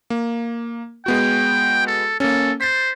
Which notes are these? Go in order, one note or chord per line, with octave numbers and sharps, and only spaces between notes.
A#3
G#3 B3 F#4 G5
A4
A#3 C#4 A4
C5 A6 B6